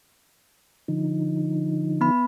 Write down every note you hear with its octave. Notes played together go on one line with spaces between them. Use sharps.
D3 F3 D#4
B3 B5